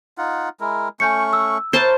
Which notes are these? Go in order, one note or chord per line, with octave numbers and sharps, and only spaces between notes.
D#4 F4 F#5
G#3 E4 A#4
A3 C#4 G#5 C#6 G6 C#7
E6
E4 A#4 C5 C#5 A5